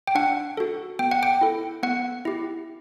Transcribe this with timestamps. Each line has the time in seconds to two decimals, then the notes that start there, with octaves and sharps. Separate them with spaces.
0.07 G5
0.15 D4 F#5
0.57 F#4 A4
0.99 B3 G5
1.11 F#5
1.23 G5
1.41 E4 A4
1.83 B3 F#5
2.25 E4 G4